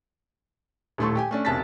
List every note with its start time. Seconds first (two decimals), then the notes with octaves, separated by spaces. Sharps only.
0.98 D#1 A2 A3 A4 C6 C#6
1.15 G4 G5 G#5
1.31 A3 C#4 D4
1.45 E1 B1 C3 A5 A6 B6